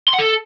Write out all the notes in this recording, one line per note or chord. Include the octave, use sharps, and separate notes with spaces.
C6
F#5
A4